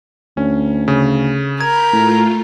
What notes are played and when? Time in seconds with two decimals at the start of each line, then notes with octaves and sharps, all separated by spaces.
0.37 D2 C#4
0.88 C#3
1.60 A#4 B5 G6 G#6 B6
1.93 A2 A3 F4